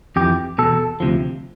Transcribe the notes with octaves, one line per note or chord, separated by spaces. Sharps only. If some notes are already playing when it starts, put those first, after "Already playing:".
F2 E3 G4
E2 B2 A4
D2 C3 F3